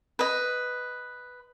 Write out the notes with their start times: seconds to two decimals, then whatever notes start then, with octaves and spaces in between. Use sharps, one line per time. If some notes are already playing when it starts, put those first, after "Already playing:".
0.19 B4 D#5